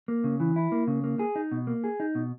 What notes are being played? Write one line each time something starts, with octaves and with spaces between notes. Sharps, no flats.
A#3
C#3
E3
E4
A#3
C#3
A#3
G#4
D#4
B2
A#3
G#4
D#4
B2